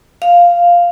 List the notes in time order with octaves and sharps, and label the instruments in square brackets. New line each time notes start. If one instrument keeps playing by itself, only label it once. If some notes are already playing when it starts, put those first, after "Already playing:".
[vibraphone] F5